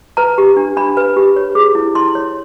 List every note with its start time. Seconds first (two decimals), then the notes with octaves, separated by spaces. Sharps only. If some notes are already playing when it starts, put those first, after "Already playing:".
0.17 B4 A#5
0.38 G4
0.57 D4
0.77 D4 B5
0.97 B4
1.16 G4
1.36 C#5
1.55 G#4
1.75 E4
1.95 E4 C6
2.15 C#5